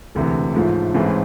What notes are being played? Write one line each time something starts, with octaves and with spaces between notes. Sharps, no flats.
E1 D2 C3 E3
A1 G#2 F3 A3
A1 G#2 E3 A3 C4